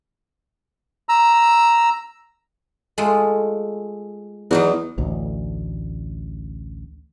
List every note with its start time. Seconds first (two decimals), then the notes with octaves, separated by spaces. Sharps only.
1.09 A#5 E6
2.98 G#3 A3 F4
4.51 E2 F#3 D#4 F#4
4.98 A1 D2